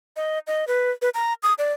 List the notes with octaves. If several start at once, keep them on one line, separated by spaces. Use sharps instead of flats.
D#5
D#5
B4
B4
A#5
D#6
D5